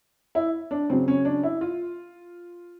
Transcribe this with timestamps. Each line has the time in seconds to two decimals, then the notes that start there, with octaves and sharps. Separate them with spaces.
0.35 E4
0.71 D4
0.90 C#3 F#3 C4
1.08 C#4
1.25 D4
1.43 E4
1.61 F4